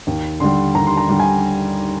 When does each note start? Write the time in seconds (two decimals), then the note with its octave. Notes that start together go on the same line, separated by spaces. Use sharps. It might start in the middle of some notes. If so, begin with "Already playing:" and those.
0.07 D#2
0.40 D3 G3 C6
0.75 D#2 A#5
0.87 C6
0.97 A#5
1.09 D3 G3
1.20 G#5